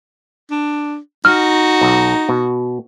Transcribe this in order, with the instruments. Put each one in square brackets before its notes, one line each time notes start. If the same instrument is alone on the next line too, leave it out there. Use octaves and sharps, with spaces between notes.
[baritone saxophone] D4
[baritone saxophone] D#4 [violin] F#4 [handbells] F6
[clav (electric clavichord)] B1
B2